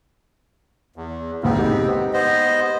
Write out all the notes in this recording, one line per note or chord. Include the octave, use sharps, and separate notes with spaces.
E2
F#1 C2 B3 C4
G#3 D#4 G4
B3 C5 D#5